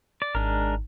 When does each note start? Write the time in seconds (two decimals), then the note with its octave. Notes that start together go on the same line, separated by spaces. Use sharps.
0.22 D5
0.35 G#1 G#3 D4 A#4